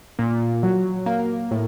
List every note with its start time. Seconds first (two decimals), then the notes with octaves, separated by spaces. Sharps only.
0.19 A#2
0.63 F#3
1.06 A#3
1.51 A2